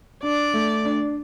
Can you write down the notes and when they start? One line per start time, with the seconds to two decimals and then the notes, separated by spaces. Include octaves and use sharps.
0.23 D4 D5
0.54 A3
0.85 D4